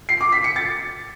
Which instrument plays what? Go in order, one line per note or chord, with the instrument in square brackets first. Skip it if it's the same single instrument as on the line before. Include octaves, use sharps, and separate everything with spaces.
[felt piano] C7
D6
B6
C#7
A6